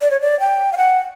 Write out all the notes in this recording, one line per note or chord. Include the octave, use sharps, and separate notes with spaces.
D5
C#5
D5
G5
F5
F#5